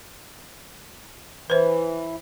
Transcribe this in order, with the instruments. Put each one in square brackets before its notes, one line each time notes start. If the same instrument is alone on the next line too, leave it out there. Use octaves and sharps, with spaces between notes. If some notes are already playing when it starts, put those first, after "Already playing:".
[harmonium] E3 [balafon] B4 C5